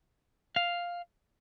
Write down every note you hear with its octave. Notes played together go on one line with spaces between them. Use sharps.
F5